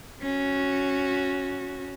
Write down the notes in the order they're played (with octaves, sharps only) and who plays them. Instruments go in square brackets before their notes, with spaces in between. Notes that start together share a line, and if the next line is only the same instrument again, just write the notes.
[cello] C#4 F#4